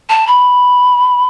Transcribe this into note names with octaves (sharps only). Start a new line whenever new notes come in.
A5
B5